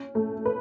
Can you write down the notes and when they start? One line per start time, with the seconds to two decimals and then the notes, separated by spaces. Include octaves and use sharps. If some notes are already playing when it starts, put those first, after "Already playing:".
Already playing: C#4
0.15 A3
0.46 B4